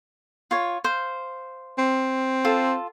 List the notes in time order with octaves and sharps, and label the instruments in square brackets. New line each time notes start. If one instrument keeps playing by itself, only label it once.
[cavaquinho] F4 C#5
C5 F5
[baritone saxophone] C4
[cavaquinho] F4 A4